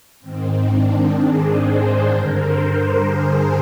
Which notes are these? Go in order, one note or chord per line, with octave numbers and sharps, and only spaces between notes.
G#2 D#3 C4
D4
G#4
C5
G2 D3 A#4
C5
A#4
G#4